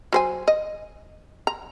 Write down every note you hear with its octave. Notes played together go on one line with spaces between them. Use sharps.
F#3 C5 G#5
D#5
A#5